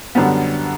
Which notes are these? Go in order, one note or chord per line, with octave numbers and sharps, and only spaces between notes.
F#2 D3 G3 B3